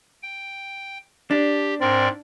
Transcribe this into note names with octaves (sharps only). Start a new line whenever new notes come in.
G5
D4 G4
G#2 C4 A#4 D5